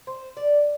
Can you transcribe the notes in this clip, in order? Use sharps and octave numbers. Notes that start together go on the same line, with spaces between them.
C5
D5